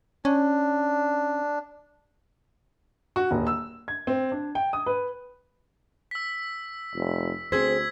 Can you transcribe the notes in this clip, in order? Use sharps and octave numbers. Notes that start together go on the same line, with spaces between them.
C#4 D4
F#4
D#1
E6
G#6
C4
D4
G5
D#6
B4
E6 B6
F1
D2 C4 G#4 C5 E6 G#6 B6